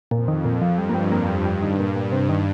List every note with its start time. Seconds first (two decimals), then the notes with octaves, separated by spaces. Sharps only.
0.11 F2 A#2
0.28 D#3
0.45 A#2
0.62 F3
0.78 G2 G3
0.89 A#3
0.95 G3
1.12 G2 A#3
1.28 G3
1.45 G2 G3
1.62 D#3
1.79 G2 A#2
1.96 A#2
2.12 G2 C3
2.29 D#3